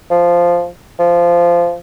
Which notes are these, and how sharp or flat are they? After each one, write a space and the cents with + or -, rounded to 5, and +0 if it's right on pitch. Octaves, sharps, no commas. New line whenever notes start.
F3 -5
F3 -15